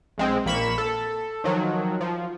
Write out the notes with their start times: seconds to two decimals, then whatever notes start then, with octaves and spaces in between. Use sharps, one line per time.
0.18 B1 G#3 C4
0.45 A#1 A#3 B5 C#6 E7
0.78 A4
1.44 D#3 F3 F#3
2.01 F3